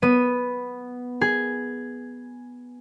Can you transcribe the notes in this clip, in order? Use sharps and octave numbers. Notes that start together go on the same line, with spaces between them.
B3 D#7
G#4